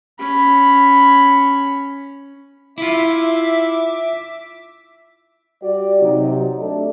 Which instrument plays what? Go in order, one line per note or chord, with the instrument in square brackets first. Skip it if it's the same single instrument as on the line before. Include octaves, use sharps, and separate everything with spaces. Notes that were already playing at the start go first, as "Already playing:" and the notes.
[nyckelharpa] C#4 B5
[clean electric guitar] E4 F4 [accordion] E5 D6
[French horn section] G3 F#4 G4 D5
C3 F#3 D#4
A3 D4